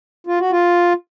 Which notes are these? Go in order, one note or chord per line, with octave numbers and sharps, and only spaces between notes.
F4
F#4
F4